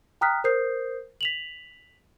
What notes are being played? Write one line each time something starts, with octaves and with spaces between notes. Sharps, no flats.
G5 A#5 D#6 F6 F#6 B6
A#4 C5 D#6 G6 C7
B6 F7 F#7